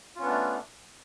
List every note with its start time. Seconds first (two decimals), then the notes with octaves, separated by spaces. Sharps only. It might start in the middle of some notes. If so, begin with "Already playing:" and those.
0.16 F4
0.19 C#4
0.22 B3
0.26 D4
0.29 A3